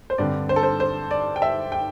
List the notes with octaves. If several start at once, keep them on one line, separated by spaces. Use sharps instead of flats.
C5
G2 D3 C4 D5
C5
A4
C5
C5
D5
G5
E5
G5